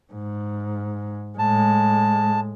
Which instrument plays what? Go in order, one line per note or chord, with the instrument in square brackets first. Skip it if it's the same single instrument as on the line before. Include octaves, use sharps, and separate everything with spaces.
[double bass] G#2
[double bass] A2 G#3 [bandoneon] A5